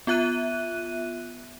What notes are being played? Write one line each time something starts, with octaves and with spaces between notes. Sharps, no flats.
B3 F4 E5 F#6 D#7